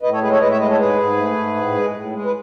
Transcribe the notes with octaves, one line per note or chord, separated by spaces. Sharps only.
A2 B4 D#5
A4 C#5
G#3 G#4 B4
A4 C#5
A2 B4 D#5
C#5 E5
G#3 B4 D#5
A4 C#5
G#2 G#4 B4
G#2
A3
G#2
A2
G#3
A2
G#3
B4